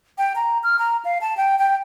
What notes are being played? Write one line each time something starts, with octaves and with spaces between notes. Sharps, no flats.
G5
A#5
F6
A#5
F5
A5
G5
G5